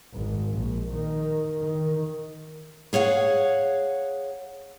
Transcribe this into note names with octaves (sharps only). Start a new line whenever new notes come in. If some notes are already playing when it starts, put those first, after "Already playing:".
G#1
A#1
D#3
D#3
G#4 C#5 F5 F#5